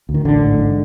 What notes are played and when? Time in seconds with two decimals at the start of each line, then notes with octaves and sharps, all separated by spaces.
0.09 D2
0.14 D#3
0.25 A1 D3
0.43 G#2
0.59 G#2